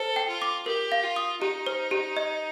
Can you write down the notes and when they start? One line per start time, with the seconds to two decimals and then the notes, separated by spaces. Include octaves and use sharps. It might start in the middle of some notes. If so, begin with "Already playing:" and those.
Already playing: A4 C5
0.16 G5
0.29 F4
0.42 D6
0.66 G4 A#4
0.92 F5
1.04 F4
1.16 D#6
1.41 D#4 G4
1.66 C5
1.91 G4
2.17 D#5